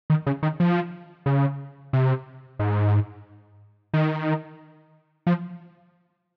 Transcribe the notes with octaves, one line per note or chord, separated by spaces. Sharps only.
D#3
C#3
D#3
F3
C#3
C3
G#2
D#3
F3